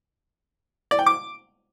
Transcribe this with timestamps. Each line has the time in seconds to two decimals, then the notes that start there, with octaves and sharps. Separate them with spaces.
0.91 D5
0.99 G5
1.06 D6